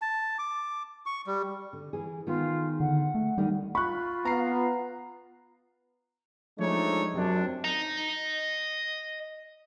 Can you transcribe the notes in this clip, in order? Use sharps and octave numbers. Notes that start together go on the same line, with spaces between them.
A5
D6
C#6
G3
D3
E3 G#4
D#3 B3 F4 G#4
D3 F#5
A3
D3 D#3 G3 D#4
F4 B5 C#6 F#6
B3 A#5 C7
F3 G#3 A3 D4 D#4 C#5
F#2 C3 D4
D#5 A#5